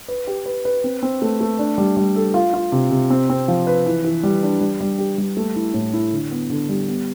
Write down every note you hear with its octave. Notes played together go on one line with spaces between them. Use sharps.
B4
G4
B4
B4
C4
C4
A3
A3
D4
G3
G3
A4
F4
F4
C3
C3
C4
C4
F3
B4
E3
E3
G3
D4
G3
G3
G4
G3
A3
E4
A2
E4
D3
B3
D3
G3
B3